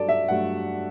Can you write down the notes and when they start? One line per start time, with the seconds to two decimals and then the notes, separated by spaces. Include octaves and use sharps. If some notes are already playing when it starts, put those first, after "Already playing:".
Already playing: G2 F#3 A3 A4 D5
0.09 E5
0.28 G2 F#3 A3 F#5